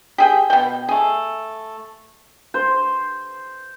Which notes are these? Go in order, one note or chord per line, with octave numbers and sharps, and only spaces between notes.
G4 G#4 G5
B2 G5
A3 G#4
C5